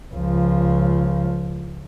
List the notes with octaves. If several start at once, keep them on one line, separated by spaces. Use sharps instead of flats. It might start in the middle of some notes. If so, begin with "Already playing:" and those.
C#2 F3